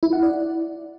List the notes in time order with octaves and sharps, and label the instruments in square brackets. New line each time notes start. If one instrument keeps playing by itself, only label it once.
[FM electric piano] E4
F#5
D5